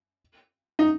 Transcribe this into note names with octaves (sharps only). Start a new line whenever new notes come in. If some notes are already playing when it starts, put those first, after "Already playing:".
D#4